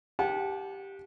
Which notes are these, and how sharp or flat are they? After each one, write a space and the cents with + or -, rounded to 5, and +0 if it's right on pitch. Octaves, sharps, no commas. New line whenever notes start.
G4 +0 F#5 -20 A5 -35